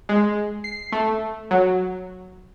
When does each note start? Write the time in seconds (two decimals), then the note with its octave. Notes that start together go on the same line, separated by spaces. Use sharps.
0.09 G#3
0.64 C7
0.92 A3
1.51 F#3